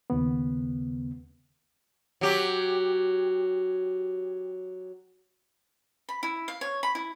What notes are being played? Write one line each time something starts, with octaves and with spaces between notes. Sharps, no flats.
D#2 C#3 B3
F#3 G4
B5
E4
F5
C#5
B5
E4